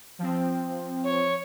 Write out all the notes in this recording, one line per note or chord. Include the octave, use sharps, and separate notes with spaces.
F3 C4
C#5